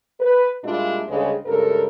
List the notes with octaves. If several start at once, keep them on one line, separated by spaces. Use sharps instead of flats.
B4
A#2 G3 G#3 D4 E4 F4
D2 C#3 G3 G#3 D4
G2 C#3 G#3 A4 A#4